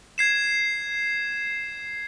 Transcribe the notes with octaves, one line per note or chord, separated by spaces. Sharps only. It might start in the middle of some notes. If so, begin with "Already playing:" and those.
G#6 C7 E7